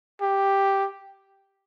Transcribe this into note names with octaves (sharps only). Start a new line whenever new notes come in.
G4